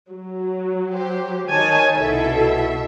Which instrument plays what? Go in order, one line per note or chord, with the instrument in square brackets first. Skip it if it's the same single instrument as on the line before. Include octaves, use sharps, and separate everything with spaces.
[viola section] F#3
[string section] G4 C5
[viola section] D#3 G#5 A5 [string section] C#5
[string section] C2 B2 E5 [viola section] E4 A4